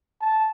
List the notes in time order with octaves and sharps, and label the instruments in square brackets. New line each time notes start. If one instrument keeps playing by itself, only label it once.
[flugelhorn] A5